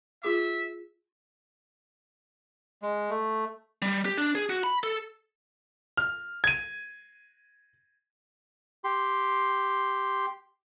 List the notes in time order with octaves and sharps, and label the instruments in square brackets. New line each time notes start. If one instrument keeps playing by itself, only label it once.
[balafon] F4 G#4 D6 [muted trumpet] E5
[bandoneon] G#3
A3
[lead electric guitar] G3
G4
D4
G#4
F#4
B5
A4
[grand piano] F6
G#6 D#7
[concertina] G4 C6